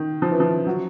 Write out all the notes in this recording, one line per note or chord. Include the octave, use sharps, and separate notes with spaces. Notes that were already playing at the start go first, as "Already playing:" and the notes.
Already playing: D#3
F3
E3
F3
F#3